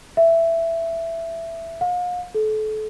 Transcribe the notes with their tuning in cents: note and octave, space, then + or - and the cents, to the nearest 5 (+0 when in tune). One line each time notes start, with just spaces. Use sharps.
E5 +10
F5 +40
A4 -35